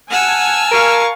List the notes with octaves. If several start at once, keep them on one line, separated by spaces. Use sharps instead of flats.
F#5 G#5 A5 E6 F6
A#4 F5 C#6